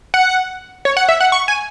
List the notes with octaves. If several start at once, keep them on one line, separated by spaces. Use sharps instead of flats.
F#5
C#5
F#5
E5
F#5
C#6
G#5